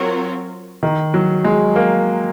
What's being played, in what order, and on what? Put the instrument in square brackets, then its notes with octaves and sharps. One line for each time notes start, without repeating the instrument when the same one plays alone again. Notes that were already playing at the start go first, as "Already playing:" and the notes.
Already playing: [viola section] F#3 C4 F4 A#4 C#5
[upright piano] D#3
F#3
G#3
A#3